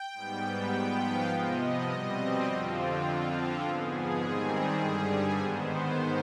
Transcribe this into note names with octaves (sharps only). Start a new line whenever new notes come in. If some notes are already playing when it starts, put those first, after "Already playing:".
Already playing: G5
G#2 G3 B3
G#2 F3 B3 G5
F5
C3 F3 B3 D#5
B2 G3 C4
F2 D3 F3 C4 F4
F2 D3 F3 C4
G#2 F3 B3 G#4
G#2 D#3 G3 C4 G#4
G2 D3 G3
G#2 D#3 B3 C5